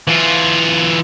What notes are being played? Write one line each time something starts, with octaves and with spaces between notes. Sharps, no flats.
E3 F4